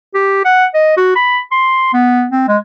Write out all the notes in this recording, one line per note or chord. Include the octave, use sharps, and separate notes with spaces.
G4
F#5
D#5
F#4
B5
C6
B3
C4
G#3